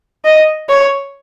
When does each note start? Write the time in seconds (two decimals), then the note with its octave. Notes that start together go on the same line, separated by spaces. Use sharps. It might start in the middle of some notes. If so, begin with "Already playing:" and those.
0.25 D#5
0.69 C#5